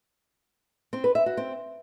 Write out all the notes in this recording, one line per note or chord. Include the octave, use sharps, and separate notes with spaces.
C4
B4
E5
F#4
C4